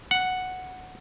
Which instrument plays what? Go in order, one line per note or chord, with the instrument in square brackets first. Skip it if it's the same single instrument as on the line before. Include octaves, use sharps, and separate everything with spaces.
[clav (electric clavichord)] F#5